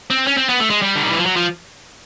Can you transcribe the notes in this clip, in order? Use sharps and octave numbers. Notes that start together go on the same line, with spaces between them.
C4
C#4
C4
B3
A3
G#3
G3
D3
D#3
E3
F3
F#3
F3